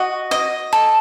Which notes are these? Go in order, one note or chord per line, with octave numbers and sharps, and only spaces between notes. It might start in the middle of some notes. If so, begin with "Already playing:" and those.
Already playing: F#4 D#5
D#5
A4